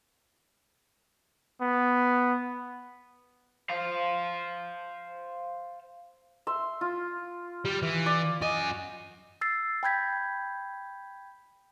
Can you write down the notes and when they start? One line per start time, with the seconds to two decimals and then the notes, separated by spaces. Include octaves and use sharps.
1.62 B3
3.69 C5 F5
6.47 E5 C6
6.81 F4
7.65 G3
7.83 E3
8.06 D5
8.42 F#2 D#5 G#5
9.41 E6 A6 C7
9.83 G5 B5 G6 G#6 B6